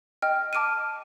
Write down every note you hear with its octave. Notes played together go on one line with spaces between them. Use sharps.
D#5 G5 F6
A5 D6 F6 D7 D#7